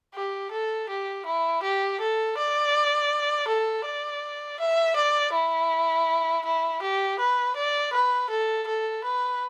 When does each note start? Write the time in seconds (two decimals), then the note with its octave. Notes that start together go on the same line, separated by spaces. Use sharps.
0.15 G4
0.52 A4
0.89 G4
1.26 E4
1.63 G4
2.00 A4
2.38 D5
3.48 A4
3.86 D5
4.60 E5
4.96 D5
5.33 E4
6.45 E4
6.82 G4
7.19 B4
7.57 D5
7.93 B4
8.30 A4
8.68 A4
9.04 B4